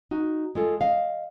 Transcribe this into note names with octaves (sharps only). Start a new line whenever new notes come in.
D#4 F#4
G#3 F4 A4
D#5 F5